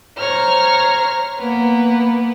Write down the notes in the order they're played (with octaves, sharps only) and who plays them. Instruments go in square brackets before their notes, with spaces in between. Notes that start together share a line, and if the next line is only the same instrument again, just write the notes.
[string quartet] C5 C#5 A#5 F6
A#3 B3 B4